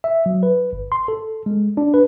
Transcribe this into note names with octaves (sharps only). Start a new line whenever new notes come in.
E5
F#3
B4
G1
C6
A4
G#3
D4
B4